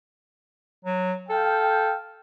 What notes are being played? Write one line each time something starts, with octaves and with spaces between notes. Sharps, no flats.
F#3
A4 F5 G5